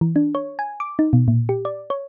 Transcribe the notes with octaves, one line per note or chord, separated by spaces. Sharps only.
E3
D4
C#5
G#5
D6
D#4
B2
A#2
G4
D5
C#5